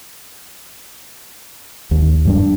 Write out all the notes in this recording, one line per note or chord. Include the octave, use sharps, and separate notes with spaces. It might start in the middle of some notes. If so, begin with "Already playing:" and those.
D#2
G2 G3 D4